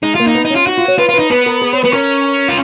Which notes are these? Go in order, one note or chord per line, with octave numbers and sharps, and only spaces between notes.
G#3 D#4
A#3 F4
D#4
B3
D#4
C#4
F4
D#4 F#4
F4
C#5
F4 B4
F4 B4
D#4
B3 B4
A#4
G#4
C#5
B3 B4
C#4 A#4
F4